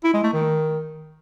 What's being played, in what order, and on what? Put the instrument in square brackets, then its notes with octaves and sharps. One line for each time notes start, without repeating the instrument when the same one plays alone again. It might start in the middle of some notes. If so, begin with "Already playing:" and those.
[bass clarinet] E4
G#3
A3
D#3